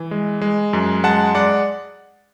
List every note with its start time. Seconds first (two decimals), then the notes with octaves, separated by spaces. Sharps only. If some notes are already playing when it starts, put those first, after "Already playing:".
Already playing: E3
0.11 G#3
0.41 G#3
0.73 F#2
1.04 G#3 F#5 A5
1.35 G#3 D5 F#5